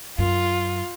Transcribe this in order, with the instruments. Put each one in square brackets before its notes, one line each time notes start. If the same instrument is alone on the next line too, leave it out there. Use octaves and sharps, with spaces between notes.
[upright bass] F#2 [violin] F4